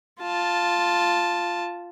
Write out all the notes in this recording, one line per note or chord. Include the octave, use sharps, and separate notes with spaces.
F4 A5